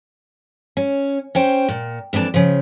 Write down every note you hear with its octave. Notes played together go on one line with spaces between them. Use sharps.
C#4
C#4 C5 G5
A#2
F2 E3 D4 G4 A5
C#3 F3